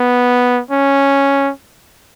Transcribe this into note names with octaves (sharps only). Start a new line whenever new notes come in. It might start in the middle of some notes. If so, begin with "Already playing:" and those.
Already playing: B3
C#4